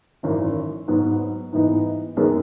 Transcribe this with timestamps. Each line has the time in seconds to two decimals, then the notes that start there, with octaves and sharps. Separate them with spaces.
0.23 G#1 F#2 E3
0.88 G#2 F#3 B3
1.52 G#2 E3 B3 D#4
2.17 F#2 D#3 G#3 B3